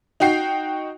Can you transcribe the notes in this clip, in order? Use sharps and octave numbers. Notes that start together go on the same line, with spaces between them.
D#4 F#4 G5 C7